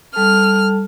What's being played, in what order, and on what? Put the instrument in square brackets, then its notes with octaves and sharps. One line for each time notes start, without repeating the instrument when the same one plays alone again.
[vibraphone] G3 A4 A5 [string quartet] F6